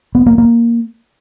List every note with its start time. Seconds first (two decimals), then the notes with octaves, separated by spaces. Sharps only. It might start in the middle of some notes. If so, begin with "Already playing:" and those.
0.15 B3
0.26 A#3
0.38 A#3